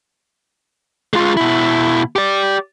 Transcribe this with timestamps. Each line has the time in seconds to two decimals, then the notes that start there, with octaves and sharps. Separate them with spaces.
1.13 G#3 F4
1.37 B2 E4
2.16 G4 D5